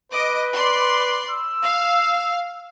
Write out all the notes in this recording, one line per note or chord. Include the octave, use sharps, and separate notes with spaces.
B4 D#5 D6 D7
D5 C6
E6
F5